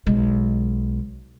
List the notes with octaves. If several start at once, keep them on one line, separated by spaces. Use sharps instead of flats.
B1 G#3